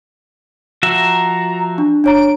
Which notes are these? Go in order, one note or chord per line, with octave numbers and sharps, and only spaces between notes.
F3 F#4 E5 A#5
D4
D4 C#5 A#5 D7